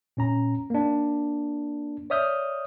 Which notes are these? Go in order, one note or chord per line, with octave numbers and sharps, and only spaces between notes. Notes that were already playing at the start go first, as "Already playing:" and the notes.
A#2 C#4 A#5
A#3 D4
C#5 D5 E5 D#6 F6 G6